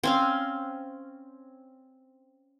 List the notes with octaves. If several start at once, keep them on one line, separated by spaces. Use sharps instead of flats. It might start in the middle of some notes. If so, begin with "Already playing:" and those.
C4 C#4 F5